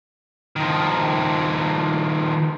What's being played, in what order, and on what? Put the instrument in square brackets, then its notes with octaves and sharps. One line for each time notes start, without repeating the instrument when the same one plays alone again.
[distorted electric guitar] D#3 F3